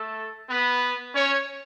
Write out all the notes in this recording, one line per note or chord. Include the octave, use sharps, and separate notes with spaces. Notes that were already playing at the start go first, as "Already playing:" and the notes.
Already playing: A3 A4
B3 B4
C#4 C#5